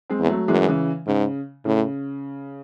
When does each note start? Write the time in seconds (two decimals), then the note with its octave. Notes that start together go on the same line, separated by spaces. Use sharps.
0.10 G#3 C4
0.20 E2
0.29 F#3 A3
0.48 F#2 E3 G#3
0.68 C#3 E3
1.07 G#2 C#3
1.65 A2 C#3